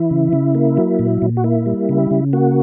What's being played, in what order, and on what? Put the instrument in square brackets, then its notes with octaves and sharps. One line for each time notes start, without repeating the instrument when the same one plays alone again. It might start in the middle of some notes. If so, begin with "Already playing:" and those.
Already playing: [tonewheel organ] E3 E4
C#3
C#3
A#3
F#3
A#2
A#2
F#4
A#3 E4
G3
C#3
C#3
A#3 F#4